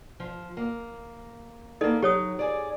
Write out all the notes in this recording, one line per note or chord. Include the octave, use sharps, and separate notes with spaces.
F3
A#3
A#3 B3 D#4 A4 D5 D#5
F#3 G4 C#5 D#6
G#4 D5